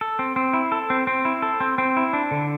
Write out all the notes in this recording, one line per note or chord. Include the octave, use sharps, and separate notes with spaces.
A4
C4
C4
E4
A4
C4
C4
E4
A4
C4
C4
E4
D4
D3